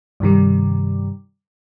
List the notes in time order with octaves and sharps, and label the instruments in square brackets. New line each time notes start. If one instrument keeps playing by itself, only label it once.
[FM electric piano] G2 C3 D#3 G3